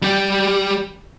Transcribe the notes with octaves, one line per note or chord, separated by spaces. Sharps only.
G3 G4